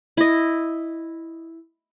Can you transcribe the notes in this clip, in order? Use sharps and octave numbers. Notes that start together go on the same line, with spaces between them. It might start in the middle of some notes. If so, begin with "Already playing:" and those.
E4 D#5